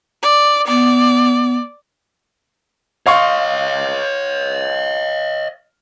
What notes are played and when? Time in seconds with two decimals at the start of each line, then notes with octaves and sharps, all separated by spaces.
0.22 D5
0.67 B3 D5
3.07 C#5 D#5 F5 C6 C#6